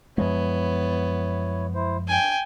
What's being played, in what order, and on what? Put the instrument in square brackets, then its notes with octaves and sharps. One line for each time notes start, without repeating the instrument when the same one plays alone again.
[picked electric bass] F#2 F3 G#3 [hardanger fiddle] B3 [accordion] E4 C#5
[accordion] E4 C5
[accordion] D4 [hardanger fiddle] G5 G#5